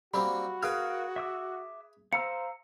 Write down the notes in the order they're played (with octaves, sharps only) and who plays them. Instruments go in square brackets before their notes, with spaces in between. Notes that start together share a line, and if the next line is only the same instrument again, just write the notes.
[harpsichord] G3 A#3 C4 [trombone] F#4 [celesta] B5
[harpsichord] G#4 B4 [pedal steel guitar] A#4 F5 F6
[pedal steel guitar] E5 D6 E6
[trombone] C5 [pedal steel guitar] F5 A#5 E6 [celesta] C#7